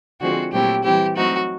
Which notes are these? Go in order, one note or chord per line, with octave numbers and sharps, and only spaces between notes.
D3 F3 G#3 C4 F#4
A#2 F#3 A3 C4 E4 G4
E3 G3 C4 E4 G4
F#3 A3 C4 D#4 F#4